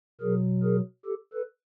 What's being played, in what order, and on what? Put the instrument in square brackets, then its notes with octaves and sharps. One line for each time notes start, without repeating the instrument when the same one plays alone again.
[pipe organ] B2 F#3 G#4 A#4
G#4 A#4
G4 A4
A4 B4